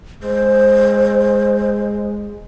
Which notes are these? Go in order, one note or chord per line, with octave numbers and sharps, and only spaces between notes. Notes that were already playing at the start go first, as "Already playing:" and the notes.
G#3 C5